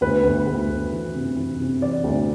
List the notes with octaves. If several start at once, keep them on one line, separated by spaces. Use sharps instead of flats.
D2 B4
D2
D2
D2
E3
C3
E3
C3
E3 D5
D2